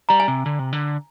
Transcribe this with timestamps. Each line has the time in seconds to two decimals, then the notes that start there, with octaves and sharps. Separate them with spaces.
0.09 G3 A#5
0.20 G#5
0.28 C3
0.46 D3
0.59 C3
0.73 D3